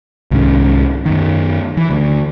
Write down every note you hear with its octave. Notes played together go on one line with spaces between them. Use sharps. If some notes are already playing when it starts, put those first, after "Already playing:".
C2 G#2 D#3 C#4
F#2 D#3
E3
D2